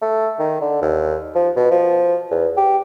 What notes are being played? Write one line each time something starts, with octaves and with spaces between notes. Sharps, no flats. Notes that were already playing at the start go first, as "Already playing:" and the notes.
A3
D#3
D3
D#2
F3
B2
F3
E2
G4